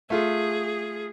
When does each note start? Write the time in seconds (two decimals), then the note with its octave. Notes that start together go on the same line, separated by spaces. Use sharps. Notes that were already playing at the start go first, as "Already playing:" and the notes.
0.10 A3 F4 G#4